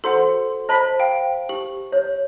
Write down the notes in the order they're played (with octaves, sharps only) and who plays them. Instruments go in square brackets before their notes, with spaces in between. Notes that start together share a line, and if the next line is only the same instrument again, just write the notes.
[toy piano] F#4 C6 [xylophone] A4 C5 F#5
[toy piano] C5 A5 [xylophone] D#5 B5 B6
[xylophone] F5 G5
[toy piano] G4 [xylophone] F#7
[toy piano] C#5